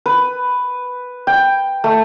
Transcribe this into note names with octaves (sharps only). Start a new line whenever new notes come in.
B4
G5
A3